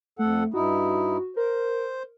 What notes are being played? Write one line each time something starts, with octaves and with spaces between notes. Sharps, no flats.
F2 A3 A4 F#5
G2 D#4 E4 F#4
A#4 C5